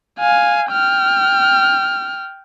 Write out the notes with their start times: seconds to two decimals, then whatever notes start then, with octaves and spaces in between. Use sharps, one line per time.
0.19 F5 G#5
0.72 G5 F6